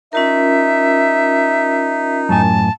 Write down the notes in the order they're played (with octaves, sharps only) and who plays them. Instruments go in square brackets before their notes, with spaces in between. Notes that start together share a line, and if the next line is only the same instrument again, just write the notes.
[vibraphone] C#4 F4 A#4 [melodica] D#4 [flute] E5
[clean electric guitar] F#2 A2 G#5 [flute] A5